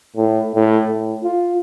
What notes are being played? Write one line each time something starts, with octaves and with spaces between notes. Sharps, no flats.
A2
A2
A2
F4